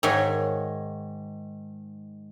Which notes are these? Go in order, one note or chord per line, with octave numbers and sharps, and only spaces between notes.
G#2 D#3 C#5 E5 G#5